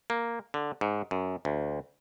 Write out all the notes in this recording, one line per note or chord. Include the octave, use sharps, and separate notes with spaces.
A#3
D3
G#2
F#2
D2